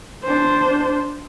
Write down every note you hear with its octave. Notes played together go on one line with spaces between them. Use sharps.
D4 C5